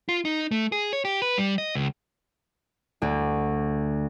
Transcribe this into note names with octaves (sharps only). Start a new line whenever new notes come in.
F4
D#4
A3
G#4
C#5
G4
B4
G3
D#5
C#2
D2 D3